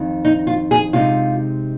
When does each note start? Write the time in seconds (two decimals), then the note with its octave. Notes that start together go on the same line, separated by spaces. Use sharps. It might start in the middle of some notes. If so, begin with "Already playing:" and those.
Already playing: F2 D#3 C4
0.25 D#4
0.47 F4
0.71 G#4
0.93 C3 G#3 D#4 F4